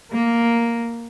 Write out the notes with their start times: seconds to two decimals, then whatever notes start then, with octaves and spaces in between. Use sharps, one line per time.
0.13 A#3